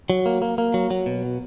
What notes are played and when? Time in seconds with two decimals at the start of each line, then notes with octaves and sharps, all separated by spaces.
0.10 F#3
0.26 A#3
0.42 A#3
0.58 A#3
0.74 F#3
0.91 F#3
1.06 B2